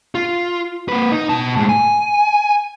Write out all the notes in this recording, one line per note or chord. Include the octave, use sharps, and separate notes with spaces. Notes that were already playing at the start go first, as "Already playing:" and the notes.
F4
A#3 B4
D#4
B2 A5
A2 G#3
G#5